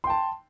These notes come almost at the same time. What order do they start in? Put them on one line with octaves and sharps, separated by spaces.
C6 G5 A5